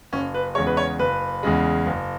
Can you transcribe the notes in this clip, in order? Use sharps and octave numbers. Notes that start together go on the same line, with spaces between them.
F#1 C#4
B4
E2 C#3 G#3 C#5
B4
C#5
F#1 B4
E2 C#3 G#3
F#1